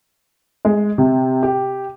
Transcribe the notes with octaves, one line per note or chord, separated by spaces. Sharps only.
G#3
C3
G4